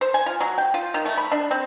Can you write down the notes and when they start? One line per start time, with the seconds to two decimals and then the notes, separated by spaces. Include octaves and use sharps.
0.01 C5
0.14 G#5
0.26 F4
0.40 F#3
0.58 G5
0.74 F4
0.94 D#3
1.05 A3
1.17 B5
1.31 D4
1.51 C4